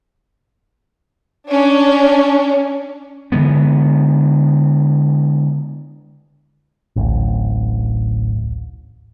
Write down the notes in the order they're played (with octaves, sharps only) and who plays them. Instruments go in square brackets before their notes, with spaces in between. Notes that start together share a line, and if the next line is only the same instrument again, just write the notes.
[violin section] C#4 D4
[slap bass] D3 E3 G#3 B3
[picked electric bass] D1 A1